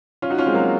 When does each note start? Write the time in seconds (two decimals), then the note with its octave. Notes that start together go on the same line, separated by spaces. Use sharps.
0.22 C#4 F4
0.30 D#4 F#4
0.38 C#4 F4
0.46 G#3 C4
0.54 F#3 A#3